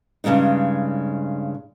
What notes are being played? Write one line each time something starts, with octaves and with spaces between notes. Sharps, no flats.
G2 C#3 G3 G#3 D#4